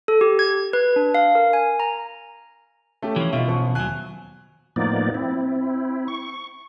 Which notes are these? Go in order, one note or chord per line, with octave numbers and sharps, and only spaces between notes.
A4
G4
G#6
B4
D4
F5
A#4
G#5
A#5
A3 C#4 G4
E3 F3 G3 C#4 E4
B2 D#4 F4 E5
A1 F3 C#6
D#2 F#3 G#5 F#6
A2 F3 A#3 B3 D#4 D5
C4 E4
C#6